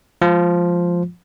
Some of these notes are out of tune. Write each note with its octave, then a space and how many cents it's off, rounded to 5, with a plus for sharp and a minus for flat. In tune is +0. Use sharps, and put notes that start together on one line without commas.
F3 +0 G#3 +0 F4 +0